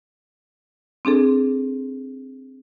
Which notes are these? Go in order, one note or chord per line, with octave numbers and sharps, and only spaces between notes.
C4 D4 G#4 A4